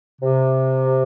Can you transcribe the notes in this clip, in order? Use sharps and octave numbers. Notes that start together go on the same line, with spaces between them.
C3